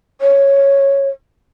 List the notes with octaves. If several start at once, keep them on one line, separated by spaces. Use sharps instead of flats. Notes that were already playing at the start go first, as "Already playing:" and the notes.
C#5